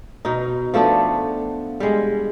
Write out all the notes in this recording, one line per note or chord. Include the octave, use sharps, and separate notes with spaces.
B2 D#4
F3 A3 B3 D4
G3 G#3